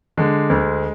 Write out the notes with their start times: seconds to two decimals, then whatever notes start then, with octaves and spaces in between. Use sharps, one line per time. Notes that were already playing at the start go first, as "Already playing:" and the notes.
0.17 D3 G#3
0.50 D2